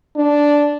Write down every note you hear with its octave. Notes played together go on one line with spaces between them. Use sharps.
D4